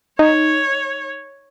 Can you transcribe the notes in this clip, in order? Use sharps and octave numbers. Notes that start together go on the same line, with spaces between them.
D#4 C#5